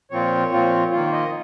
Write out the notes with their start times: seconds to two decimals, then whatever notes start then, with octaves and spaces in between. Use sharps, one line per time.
0.11 A#2 F3 C4 F4 C#5
0.51 A#2 F3 C4 F4
0.92 D#3 A#3 F4
1.13 D#5